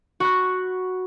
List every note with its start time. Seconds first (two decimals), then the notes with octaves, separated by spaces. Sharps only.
0.20 F#4 B5 F#6